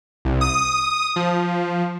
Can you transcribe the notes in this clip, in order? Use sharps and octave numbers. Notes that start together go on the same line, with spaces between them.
C2
D#6
F3